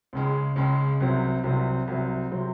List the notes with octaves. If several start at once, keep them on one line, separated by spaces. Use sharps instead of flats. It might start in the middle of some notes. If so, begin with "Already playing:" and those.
C#2 C#3 G#3
C#2 C#3 G#3
C2 C3 F#3 C4
C2 C3 F#3 C4
C2 C3 F#3 C4
C3 F#3 C4